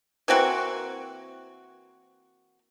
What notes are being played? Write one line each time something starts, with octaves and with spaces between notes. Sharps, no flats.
E3 A#3 C4 F#4